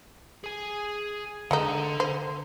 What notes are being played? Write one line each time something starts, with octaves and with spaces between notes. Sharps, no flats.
G#4 G#5
D3 G#3 A3 D#4 A4 F#5
C5